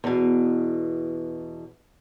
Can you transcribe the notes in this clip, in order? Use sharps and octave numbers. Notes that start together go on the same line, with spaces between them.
E2 B2